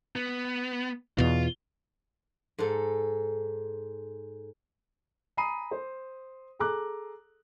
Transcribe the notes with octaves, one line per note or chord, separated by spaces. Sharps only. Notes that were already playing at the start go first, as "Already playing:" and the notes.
B3
E2 B2 F4
G#2 A4
G#5 A#5 B5 D#6 C7 D#7
C5
G#4 A4 A#5 D6 F#6